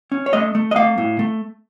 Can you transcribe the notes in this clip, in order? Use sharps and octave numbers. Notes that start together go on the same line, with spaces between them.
C#4
C#5
A3 D#5
A3
D#5
A3 F5
A2
A3